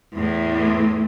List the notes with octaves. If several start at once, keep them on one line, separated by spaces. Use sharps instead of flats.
E2 A2